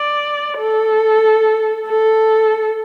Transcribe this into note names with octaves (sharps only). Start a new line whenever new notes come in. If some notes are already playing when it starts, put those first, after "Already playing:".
Already playing: D5
A4
A4